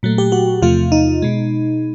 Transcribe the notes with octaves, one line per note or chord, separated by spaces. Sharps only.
A#2 F#3 A3
G4
F#4
E2 C3 F3 A3 F4
D#4
B2 G#3